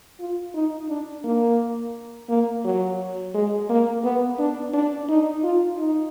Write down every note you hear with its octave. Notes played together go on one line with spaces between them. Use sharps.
F4
D#4
D4
A#3
A#3
F#3
G#3
A#3
B3
D4
D4
D#4
F4
D#4